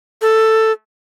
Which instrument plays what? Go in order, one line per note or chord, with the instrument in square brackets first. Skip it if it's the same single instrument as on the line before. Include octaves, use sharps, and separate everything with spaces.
[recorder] A4